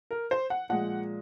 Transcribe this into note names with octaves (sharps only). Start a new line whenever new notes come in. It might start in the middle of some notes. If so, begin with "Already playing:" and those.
A#4
C5
F#5
A#2 F3 G#3 F#5